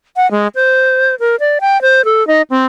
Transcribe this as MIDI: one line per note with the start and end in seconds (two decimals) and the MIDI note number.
0.16 0.29 78
0.31 0.48 56
0.55 1.15 72
1.20 1.36 70
1.40 1.58 74
1.61 1.81 79
1.82 2.04 72
2.05 2.26 69
2.28 2.42 63
2.50 2.66 60